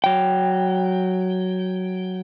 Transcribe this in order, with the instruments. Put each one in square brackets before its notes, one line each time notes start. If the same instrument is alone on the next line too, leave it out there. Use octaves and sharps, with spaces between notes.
[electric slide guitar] F#3 G5